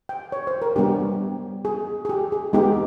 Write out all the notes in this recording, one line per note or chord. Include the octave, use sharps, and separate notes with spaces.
G5
C#5
C5
A#4
G3 B3 D4 G4
G#4
G#4
G4
G#4
G#3 B3 D#4 G4